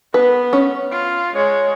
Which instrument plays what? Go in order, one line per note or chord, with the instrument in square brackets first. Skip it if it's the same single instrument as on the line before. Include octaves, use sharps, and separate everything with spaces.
[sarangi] B3 [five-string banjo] B4
[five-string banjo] C#4
[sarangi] F4
[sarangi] G#3 [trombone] C#5